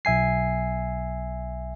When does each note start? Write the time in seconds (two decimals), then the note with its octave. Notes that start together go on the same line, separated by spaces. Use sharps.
0.05 B1 E5 G#5 C7